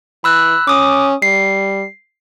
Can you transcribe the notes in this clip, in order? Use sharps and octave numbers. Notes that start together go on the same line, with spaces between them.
E3 B5 E6 F#6
C#4 D6 D#6
G3 C7